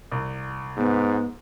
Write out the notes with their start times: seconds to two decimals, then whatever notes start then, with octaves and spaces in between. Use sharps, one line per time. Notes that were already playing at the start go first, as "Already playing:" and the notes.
0.11 C2
0.77 G#2 B3